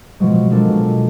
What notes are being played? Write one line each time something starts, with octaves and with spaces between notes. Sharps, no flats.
B2 F3 F#3 G#3
G#3 A#3 D4 A4
B2